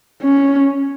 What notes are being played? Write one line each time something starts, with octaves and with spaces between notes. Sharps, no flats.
C#4